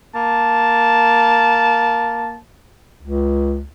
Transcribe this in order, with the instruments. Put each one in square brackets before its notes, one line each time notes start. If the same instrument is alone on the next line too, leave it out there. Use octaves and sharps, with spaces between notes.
[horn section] A#3 A5
[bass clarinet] C#2